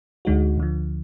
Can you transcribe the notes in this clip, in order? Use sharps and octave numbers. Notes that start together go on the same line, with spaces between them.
D2 D3 G#3 D#4 F#4
D2 D3 F3